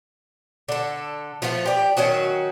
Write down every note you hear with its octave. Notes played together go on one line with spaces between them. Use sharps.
D3 A4
F3 A3 B3 F4
G4 D5
D#3 F#3 C#4 F#4